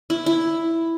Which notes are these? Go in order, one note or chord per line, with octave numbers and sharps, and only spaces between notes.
E4
E4